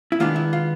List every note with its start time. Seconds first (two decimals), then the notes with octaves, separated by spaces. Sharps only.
0.12 E4
0.20 D#3 G#3 B3 D4 F4
0.36 E4
0.53 F4